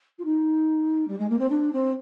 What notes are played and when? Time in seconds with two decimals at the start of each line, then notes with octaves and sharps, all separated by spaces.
0.18 F4
0.24 D#4
1.08 G3
1.18 G#3
1.29 A#3
1.38 C4
1.50 D4
1.72 C4